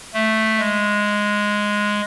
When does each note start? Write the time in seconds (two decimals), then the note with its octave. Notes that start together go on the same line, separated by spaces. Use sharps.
0.14 A3
0.59 G#3